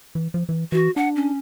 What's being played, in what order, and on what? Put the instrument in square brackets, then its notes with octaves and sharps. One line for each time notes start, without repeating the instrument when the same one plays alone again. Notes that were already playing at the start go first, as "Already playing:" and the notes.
[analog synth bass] E3
F3
E3
[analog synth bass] E3 [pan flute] F#4
[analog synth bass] D4 [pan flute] F#5
[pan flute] C#4